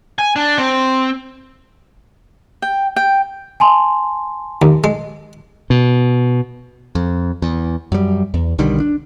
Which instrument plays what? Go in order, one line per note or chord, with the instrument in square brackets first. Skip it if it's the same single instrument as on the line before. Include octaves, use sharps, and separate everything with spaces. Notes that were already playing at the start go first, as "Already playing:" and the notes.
[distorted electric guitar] G#5
D4
C4
[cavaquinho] G5
G5
[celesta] G#5 A5 C6
[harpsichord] D#2
G#3
[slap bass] B2
[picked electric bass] F2
E2
F#2 G3
E2
B1 D3 D#3 G3
D4